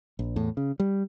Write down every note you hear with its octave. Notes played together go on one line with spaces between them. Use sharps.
A#1
E2 A2
C#3
G3